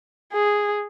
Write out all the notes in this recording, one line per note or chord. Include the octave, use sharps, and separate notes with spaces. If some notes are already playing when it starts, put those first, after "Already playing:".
G#4